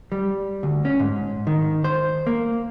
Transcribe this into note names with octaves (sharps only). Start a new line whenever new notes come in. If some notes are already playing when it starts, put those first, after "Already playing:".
G3
D2
C#4
G#2
D#3
C5
A#3